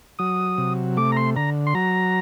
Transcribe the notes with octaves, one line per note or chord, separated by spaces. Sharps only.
F#3 D#6
C3
A3 D6
A#5
C6
D3 A#5
C6
F#3 A#5